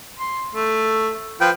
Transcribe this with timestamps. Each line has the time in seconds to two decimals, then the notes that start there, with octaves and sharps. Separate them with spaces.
0.19 C6
0.55 A3
1.41 F3 B4 G5